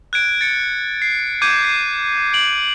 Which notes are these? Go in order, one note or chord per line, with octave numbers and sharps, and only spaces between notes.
F#6 G#6 D7
A6 C#7
C7
D6 G6 G#6 D#7
C7
D7 F#7